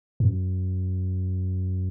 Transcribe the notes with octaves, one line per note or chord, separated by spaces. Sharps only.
F#2